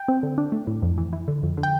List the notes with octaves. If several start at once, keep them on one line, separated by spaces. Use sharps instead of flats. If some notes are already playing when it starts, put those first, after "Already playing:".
Already playing: G5
C4
D3
D4
A3
A2
F2
E3
E3
D3
F2
D3
G5